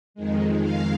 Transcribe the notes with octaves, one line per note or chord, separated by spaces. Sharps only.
F2 D#3 G#3
F5